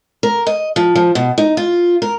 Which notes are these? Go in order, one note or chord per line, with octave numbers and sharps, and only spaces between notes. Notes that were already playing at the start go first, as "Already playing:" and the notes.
A#4
D#5
F3
F3
B2
D#4
F4
A#4